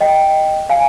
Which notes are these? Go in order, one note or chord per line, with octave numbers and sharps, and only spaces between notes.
D#5 G5
F5 G#5